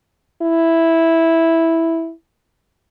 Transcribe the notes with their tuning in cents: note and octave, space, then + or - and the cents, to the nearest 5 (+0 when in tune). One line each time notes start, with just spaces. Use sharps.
E4 -5